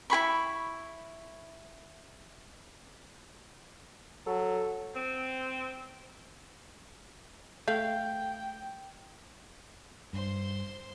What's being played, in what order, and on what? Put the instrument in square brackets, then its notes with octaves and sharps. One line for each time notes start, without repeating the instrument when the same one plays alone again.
[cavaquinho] E4 G#4 B5 C#6
[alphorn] F#3 [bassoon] A4
[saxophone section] C4
[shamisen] A3 [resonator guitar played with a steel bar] F5 [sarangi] G5 [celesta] G6
[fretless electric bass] G2 [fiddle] C5 C6